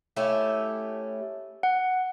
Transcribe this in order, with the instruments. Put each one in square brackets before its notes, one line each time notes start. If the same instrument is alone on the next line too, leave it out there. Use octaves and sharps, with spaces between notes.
[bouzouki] A3 C#4 E4 G4
[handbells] F#5